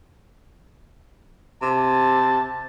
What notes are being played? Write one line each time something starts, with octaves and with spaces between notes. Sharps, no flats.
C3 A5